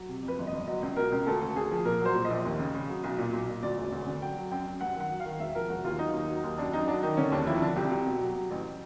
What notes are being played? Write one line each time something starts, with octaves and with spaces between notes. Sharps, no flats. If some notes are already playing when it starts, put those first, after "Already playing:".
Already playing: F#3
C3
F2
B4
G1
D#5
G1
F#3 D#5
C#2
B2 A#4
C#2
D2 A4
D2
D2 G#4
F3
A#2 A#4
F#3 C5
A#2
D#5
A#1
D#2
C#3
C#3
F#3
B1
A#2
B1
A#2
D2 D5
E1
D2
D3
F#3 G5
F#3
F#2 G5
F#2
G2 F#5
D#3 F#5
F#3
F5
D#3
E1 E5
F3 A#4
E1 F#4
D#2 F4
F#3 D#4
D#2
F#3
D#2
F#2 D4
F#2 D#4
F#3 D4
D#3 D#4
D3 C#4
D#2 D4
F3 E4
D3 D4
C2 G4
C2
B2
F#3
F#3
A1